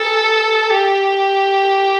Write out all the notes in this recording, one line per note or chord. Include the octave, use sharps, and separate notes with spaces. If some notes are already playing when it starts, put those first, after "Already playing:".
Already playing: A4
G4